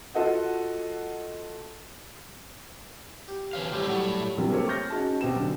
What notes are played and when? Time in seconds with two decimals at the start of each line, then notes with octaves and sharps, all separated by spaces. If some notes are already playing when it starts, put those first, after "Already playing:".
0.15 F4 F#4 A4 D#5 F#5
3.28 G4
3.53 E3 C#5 F5
3.72 A2 C3 G3 G4 C#5
3.87 A2 F#3 G3 D4 C#5
4.38 A#1 C3 E3 F#3 G3
4.51 A3 A#3 C4 G4 A4 C#5
4.68 C#6 F6 G6 A#6
4.90 C#4 D#4 F#4 G#4 A5
5.21 B2 C4 G4 E7
5.36 B1 D3